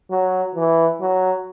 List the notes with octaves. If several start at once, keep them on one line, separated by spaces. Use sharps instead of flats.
F#3
E3
F#3